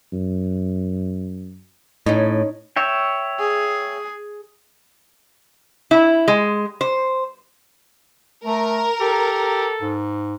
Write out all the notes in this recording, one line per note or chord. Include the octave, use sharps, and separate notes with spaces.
F#2
A2 C#4 D#4
C#5 E5 G5
G#4
E4
G#3
C5
A3 A#4
G4 A4
G#2